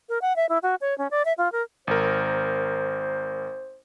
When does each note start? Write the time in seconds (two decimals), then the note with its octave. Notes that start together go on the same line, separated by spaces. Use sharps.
0.09 A#4
0.22 F#5
0.36 E5
0.49 E4
0.63 F#4
0.81 C#5
0.98 C#4
1.11 D5
1.25 E5
1.38 F4
1.52 A#4
1.87 G#1 A#4 C5